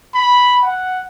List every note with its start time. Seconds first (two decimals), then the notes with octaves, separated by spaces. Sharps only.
0.14 B5
0.63 F#5